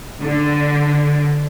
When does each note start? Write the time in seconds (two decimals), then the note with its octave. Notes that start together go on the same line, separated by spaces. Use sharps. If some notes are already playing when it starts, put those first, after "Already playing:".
0.22 D3